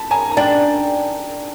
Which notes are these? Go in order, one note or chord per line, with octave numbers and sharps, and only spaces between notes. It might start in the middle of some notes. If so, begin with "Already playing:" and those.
Already playing: A5 B5
G#5 A#5
A#5
D4 G5 A5